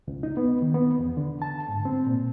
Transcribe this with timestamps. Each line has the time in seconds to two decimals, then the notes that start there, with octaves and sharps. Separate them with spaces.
0.08 C#2
0.23 D#4
0.37 B3
0.62 D#3
0.74 B3
0.99 E2
1.17 D3
1.42 A5
1.69 G#2
1.85 C4
2.07 A#2